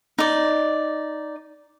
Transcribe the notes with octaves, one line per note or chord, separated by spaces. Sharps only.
D#4 D5